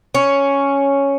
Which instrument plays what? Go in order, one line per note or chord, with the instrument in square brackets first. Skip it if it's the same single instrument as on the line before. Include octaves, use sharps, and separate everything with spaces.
[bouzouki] C#4